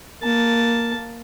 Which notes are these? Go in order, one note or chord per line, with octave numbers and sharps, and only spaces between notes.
A#3 A5